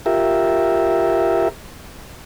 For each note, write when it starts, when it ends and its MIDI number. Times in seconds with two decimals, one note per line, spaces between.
0.06 1.48 65
0.06 1.48 67
0.06 1.48 70
0.06 1.48 76